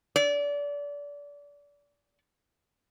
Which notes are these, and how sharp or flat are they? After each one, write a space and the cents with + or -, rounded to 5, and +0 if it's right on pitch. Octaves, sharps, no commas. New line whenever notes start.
D5 -30